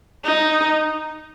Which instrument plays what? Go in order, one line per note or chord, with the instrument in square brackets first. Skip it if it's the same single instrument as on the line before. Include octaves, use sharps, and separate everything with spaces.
[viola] D#4